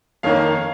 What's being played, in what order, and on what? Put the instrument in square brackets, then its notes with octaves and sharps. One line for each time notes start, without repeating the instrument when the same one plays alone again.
[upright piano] F2 D#3 A#3 C#5 F5